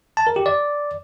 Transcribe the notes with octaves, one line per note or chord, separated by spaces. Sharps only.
A5
A#4
G4
D5